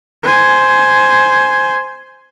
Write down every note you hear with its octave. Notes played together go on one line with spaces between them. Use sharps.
C5 G#5